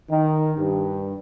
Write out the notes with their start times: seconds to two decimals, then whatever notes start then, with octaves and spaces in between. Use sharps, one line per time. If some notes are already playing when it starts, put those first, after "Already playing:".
0.10 D#3
0.57 G2